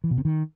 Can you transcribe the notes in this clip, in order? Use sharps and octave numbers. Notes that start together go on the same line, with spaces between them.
E3
B2
C3
D#3